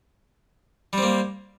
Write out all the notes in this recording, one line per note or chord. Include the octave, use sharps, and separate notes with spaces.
G3 A#3 C4